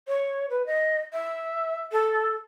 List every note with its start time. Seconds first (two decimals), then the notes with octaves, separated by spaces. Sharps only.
0.08 C#5
0.50 B4
0.66 D#5
1.13 E5
1.92 A4